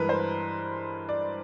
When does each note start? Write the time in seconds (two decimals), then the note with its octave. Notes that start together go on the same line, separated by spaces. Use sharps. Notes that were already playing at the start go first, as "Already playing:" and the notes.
Already playing: G2 E3 G#3 A#4 B4
0.09 C5
1.09 D5